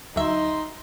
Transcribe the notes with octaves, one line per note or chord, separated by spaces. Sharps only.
D2 F#3 D#4 E5 C6